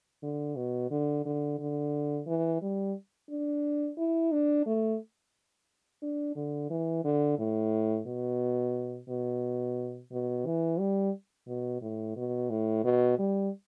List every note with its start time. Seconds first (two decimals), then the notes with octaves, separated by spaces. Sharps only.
0.23 D3
0.56 B2
0.91 D3
1.26 D3
1.59 D3
2.27 E3
2.62 G3
3.29 D4
3.98 E4
4.32 D4
4.66 A3
6.02 D4
6.36 D3
6.70 E3
7.05 D3
7.39 A2
8.07 B2
9.09 B2
10.12 B2
10.46 E3
10.79 G3
11.48 B2
11.82 A2
12.16 B2
12.50 A2
12.84 B2
13.19 G3